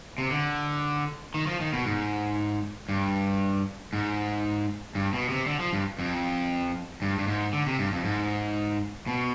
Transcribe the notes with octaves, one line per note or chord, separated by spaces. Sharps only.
C3
D3
D#3
F3
D#3
B2
G#2
G2
G#2
G2
B2
C3
D3
F3
G2
F2
G2
G2
G#2
D3
C3
G2
F2
G#2
B2